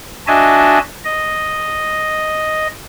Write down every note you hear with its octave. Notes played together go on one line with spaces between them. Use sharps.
D4 F#4 D#5 E5 G#5 A5
D#5